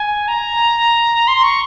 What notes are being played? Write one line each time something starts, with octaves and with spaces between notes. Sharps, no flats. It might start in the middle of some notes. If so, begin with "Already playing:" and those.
Already playing: G#5
A#5
C6
C#6